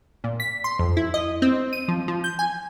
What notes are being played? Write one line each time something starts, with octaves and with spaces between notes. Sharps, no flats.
A#2
B6
C6
F2
E4
D#5
C4
D#7
F3
F3
G6
G#5